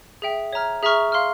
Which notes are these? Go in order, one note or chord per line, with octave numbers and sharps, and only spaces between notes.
G#4 E5 G5
C#5 E5 A#5 F6
G#4 E5 A#5 C#6 F6
F5 C6 F6